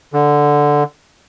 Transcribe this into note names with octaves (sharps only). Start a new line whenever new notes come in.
D3